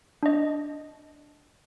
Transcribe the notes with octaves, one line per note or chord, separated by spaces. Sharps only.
D4 D#5